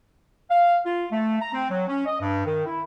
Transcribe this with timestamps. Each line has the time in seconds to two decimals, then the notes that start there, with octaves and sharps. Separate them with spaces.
0.50 F5
0.85 F4
1.11 A3
1.40 A#5
1.53 C4
1.70 F#3
1.87 C#4
2.06 D#5
2.21 G2
2.45 D#3
2.66 E4